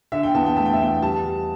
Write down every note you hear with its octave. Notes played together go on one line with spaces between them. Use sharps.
D3 E5
G5
E2 A5
G5
A3 A5
G5
E5
E2 G5
G3 A5
G3